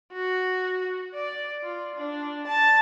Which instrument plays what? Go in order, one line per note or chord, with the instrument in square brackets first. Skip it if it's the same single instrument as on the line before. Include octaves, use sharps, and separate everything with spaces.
[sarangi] F#4
D5
F4
D4
A5